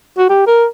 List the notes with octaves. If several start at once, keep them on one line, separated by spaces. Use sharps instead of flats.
F#4
G4
A#4